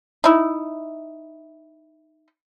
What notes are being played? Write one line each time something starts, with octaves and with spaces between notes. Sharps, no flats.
D#4 E4